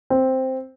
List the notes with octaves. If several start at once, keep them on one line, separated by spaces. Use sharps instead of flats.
C4